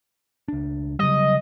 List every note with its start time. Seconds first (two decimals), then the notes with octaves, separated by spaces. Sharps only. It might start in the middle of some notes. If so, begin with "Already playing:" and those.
0.48 C#2 D4
0.99 C#3 F#3 G3 D#5